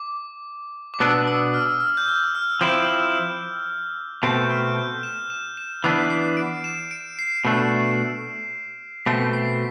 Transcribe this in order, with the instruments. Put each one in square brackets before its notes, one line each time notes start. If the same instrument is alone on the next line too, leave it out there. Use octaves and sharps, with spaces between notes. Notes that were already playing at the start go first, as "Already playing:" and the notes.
Already playing: [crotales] D6
D6
[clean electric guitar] B2 B3 D4 [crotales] E6
[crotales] E6
F6
F6
G6
F6
F6
[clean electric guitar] F3 C4 E4 [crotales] G6
[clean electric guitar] B2 A3 C4 [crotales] G6
[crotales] F6
G6
E7
E7
E7
[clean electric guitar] E3 B3 D4 [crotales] C7
[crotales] C7
D7
E7
D7
C7
[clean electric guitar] B2 A3 D4
[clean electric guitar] B2 A3 C4 [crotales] B6
[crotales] C7